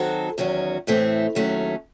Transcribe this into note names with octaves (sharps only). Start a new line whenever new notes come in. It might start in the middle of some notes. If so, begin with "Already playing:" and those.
Already playing: D#3 F#3 C4 F#4 A4
E2 D#3 F#3 C#4 F#4
A2 E3 A3 C4
D#2 D#3 F#3 A3 C#4